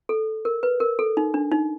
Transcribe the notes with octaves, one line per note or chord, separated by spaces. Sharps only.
A4
A#4
B4
A#4
A4
D#4
D4
D#4